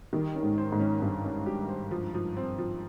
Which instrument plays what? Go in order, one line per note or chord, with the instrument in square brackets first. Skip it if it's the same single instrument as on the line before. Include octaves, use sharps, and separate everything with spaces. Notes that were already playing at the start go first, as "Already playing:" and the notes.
[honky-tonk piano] D#3 [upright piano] G3
[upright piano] C#4
[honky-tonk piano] G#2
[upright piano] C5
[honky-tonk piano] G#2
[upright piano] C#4
[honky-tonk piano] G2 [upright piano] C#4
[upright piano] C#4
G4
C5
F3
F3
C4
F3